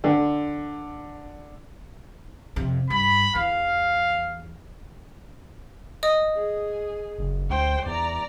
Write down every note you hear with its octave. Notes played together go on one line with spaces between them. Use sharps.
D3
F2 C3
G2 B5
E2 F5
D#5 D#6
G#4
F#1
D2 C5 G5
E2 D5 A#5